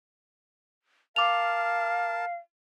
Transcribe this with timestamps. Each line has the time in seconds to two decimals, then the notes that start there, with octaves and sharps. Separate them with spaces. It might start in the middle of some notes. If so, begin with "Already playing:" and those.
1.16 A#4 F5 A5 D6 F7